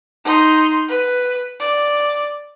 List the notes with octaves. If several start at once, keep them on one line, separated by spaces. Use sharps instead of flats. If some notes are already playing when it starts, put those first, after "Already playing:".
D#4 C6
B4
D5